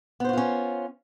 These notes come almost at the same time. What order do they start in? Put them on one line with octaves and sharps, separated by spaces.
B3 C5 F#4 F4 C#4